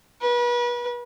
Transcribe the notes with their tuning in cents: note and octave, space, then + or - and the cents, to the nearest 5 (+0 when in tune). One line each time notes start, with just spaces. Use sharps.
B4 -35